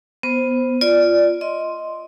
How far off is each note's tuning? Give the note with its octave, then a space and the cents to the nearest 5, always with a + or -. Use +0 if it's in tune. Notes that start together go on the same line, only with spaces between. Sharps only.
B3 +0 C5 +0
F4 -10 D5 +0
D#5 +15 C6 +0